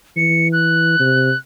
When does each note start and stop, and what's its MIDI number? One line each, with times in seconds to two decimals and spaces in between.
0.17 0.95 52
0.17 0.48 97
0.53 1.37 90
0.99 1.30 48